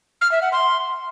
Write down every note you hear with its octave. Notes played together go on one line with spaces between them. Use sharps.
F6
E5
F#5
C6